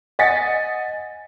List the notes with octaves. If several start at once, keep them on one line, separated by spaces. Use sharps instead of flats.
D#5 F#5 G#5 A6 B6 C#7